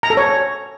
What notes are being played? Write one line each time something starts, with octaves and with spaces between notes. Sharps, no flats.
A#5
A4
C#5